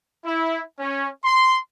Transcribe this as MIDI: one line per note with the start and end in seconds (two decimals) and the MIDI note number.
0.25 0.60 64
0.80 1.08 61
1.24 1.57 84